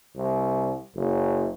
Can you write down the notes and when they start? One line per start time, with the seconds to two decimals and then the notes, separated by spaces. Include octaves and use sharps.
0.16 C2
0.95 F#1